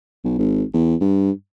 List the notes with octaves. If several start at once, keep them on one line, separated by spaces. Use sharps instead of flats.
B1
G#1
E2
G2